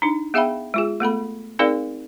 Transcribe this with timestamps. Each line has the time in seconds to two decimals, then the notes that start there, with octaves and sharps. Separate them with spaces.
0.02 D4 D#4
0.34 B3 G#4 E5 F5 G5 B5
0.74 G#3 F4 G#4
1.00 A3 B3 A4 B5
1.59 C4 D#4 G#4 A#4 D5 F5